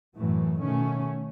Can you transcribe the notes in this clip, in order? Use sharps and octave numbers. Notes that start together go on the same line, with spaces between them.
F#2 A2 E3 A3
B2 D#3 A3 C#4